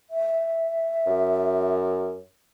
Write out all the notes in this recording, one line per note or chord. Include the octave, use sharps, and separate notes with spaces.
E5
F#2